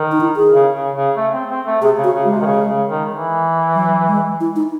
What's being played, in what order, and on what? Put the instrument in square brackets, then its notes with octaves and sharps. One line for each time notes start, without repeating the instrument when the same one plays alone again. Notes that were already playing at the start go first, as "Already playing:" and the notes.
Already playing: [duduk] D#3
[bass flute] D#4
E4
G#4
[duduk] C#3
C#3
C#3
A3
C4
C4
A3
[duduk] C3 [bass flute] G#4
[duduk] C#3
[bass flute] F#4
[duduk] C#3
[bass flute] G#3
[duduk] C3
D#3
C#3
C#3
D#3
E3
[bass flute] F#3
G#3
E4
D#4